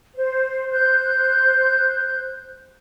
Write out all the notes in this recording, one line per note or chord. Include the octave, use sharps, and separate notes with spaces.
C5
C5 F#6 G6